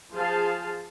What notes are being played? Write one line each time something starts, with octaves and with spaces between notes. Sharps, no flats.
F3 G#4 C5 F5 A5